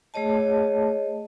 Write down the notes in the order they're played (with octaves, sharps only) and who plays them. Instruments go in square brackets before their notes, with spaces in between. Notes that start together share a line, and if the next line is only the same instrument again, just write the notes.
[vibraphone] A3 G#4 C#5 D#5 A5